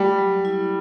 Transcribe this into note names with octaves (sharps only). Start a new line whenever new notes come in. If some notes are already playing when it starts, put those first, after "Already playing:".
Already playing: G3 A3
F#3
E4